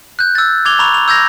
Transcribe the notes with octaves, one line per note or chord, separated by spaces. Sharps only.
F#6 G6
E6 A6
D6 G#6 F7 G7
A#5 B5 C#6 F7
F7
E6 G6 G#6 A#6 F7